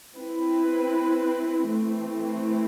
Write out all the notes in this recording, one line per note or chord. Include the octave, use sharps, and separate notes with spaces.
C4 E4 B4
E3 A3 C4